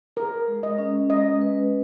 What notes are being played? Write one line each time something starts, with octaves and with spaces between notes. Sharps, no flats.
G#4 A#4
G#3
D#5
C#4
G#3 D#5
B4